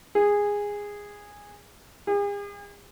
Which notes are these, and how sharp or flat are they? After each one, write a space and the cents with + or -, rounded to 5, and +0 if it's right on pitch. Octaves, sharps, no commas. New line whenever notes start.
G#4 -15
G#4 -45